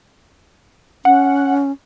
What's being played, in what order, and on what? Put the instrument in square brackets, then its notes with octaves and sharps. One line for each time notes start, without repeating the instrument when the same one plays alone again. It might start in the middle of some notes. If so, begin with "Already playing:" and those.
[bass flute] C#4 [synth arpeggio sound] F#5